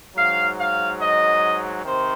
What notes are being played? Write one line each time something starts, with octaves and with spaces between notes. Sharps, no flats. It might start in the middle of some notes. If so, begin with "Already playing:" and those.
G#2 F#3 F5
F5
D#5
C3 D#3 C5